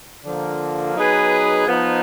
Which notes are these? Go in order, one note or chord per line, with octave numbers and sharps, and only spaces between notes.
D3 F3 A#3
F#3 B3 D#4 G#4 B4
F3 B3 D#4